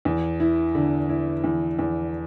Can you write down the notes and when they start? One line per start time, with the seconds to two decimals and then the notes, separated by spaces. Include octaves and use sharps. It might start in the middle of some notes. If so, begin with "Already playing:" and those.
0.05 E2
0.40 E4
0.75 D3
1.09 E4
1.44 E2
1.79 E2